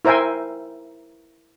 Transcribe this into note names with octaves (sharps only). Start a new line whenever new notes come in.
E4 A#4 C5 E5 G5 G#5